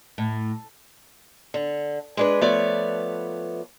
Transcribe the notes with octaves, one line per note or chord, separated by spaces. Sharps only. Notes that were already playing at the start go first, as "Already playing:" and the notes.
A2
D3
G#3 D4 B4
F3 A3 B3 B4 C#5 D5